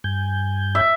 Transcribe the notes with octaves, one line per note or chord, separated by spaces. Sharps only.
G2 G#5 G6
E5